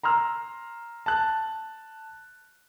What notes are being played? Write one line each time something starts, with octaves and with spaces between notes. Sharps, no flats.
A#5 C6 E6 F6
A5 F#6